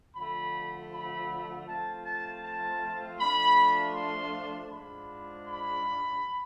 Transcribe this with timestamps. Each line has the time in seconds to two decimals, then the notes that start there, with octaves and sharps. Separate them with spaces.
0.16 D3 F3 A3 B5
0.91 B5
1.67 F3 A3 C4 F4 A5
2.05 A5
2.43 A5
3.19 F3 A3 D4 F4 B5
3.95 C6
4.70 G#2 F3 G#3 D4 F4 B5
5.47 B5